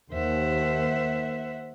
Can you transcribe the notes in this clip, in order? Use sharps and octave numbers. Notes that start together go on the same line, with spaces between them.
D#2 C5 E5 F#5